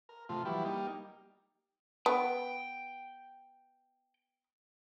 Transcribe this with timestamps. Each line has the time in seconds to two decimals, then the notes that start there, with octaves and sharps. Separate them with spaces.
0.09 A#4
0.29 C3 F3 A3 F4
0.45 E3 F#3 G3 E4 G4 B4
0.65 G3 A#3 D#4 G4
2.06 B3 G5